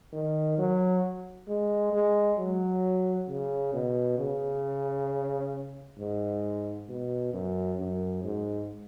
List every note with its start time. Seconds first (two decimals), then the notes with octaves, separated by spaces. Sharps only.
0.13 D#3
0.58 F#3
1.48 G#3
1.93 G#3
2.38 F#3
3.28 C#3
3.73 B2
4.18 C#3
5.98 G#2
6.89 B2
7.33 F#2
7.79 F#2
8.23 G#2